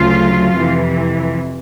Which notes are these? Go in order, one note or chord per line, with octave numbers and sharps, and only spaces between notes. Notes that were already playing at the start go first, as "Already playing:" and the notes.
Already playing: D2 C#3 F#3 A3 F4
F2 C3 E3